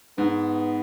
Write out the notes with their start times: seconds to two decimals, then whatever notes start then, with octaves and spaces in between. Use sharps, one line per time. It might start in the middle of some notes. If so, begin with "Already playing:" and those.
0.17 G#2 B3